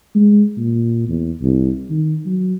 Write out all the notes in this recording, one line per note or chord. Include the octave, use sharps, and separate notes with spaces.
G#3
A#2
E2
C2
D#3
F#3